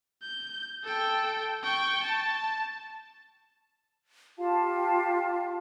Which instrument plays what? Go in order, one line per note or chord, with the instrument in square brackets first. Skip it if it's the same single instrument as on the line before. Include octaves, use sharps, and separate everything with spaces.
[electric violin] G6
A4 G5
G5 C#6
A5
[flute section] F4 G4 F5 A5